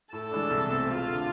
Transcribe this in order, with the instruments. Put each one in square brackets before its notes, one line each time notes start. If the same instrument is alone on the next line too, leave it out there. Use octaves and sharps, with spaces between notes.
[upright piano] A2 [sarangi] A4
[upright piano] E3 G#3 D4
C2
B2 A3 C4
[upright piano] E1 [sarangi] F4
[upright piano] D3